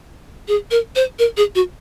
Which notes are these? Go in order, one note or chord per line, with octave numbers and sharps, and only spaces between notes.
G#4
A#4
C5
A#4
G#4
F#4